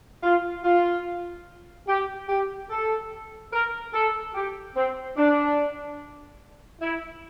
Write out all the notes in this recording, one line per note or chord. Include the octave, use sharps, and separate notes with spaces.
F4
F4
G4
G4
A4
A#4
A4
G4
C4
D4
E4